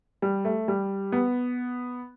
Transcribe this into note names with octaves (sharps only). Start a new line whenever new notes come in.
G3
A3
G3
B3